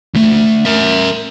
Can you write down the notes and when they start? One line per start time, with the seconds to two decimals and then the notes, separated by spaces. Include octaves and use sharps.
0.14 D2 A3
0.65 A#4 E5